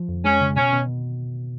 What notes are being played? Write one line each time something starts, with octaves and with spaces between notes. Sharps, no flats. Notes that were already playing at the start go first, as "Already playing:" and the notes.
Already playing: F3
F2
G#3 C#4
C#3
B2 C#4
B2